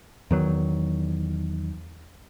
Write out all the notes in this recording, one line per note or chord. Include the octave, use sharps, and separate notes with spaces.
E2 D#3 F#3